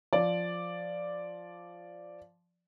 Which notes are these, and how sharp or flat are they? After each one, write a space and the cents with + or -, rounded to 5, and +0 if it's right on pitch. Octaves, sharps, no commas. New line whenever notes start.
F3 +0 D5 +0